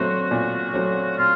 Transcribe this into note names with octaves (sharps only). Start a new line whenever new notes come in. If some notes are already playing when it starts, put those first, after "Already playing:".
Already playing: A#2 F#3 A3 C4 F#4
A#2
F#3 A3 C4
A#2 F4